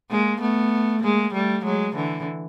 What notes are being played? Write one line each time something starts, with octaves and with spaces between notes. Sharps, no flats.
G#3 A#3
A3 B3
G#3 A#3
G3 A3
F#3 G#3
D3 E3